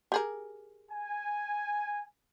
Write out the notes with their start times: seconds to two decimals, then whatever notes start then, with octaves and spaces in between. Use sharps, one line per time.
0.12 G4 G#4 A#4
0.91 G#5